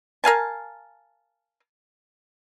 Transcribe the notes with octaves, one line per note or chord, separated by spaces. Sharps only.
A#4 F5 G#5 A5